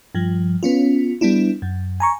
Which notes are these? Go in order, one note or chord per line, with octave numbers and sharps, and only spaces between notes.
G2 F3
B3 C#4 F4
G3 B3 D4 E4
F#2
G#5 A#5 C#6